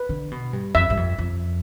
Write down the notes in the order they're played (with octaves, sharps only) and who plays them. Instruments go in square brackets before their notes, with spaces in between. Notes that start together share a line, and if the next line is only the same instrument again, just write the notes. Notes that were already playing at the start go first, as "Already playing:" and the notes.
Already playing: [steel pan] B4
[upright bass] D3
B2
G2
[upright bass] F2 [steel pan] E5
[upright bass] G2
F2
F2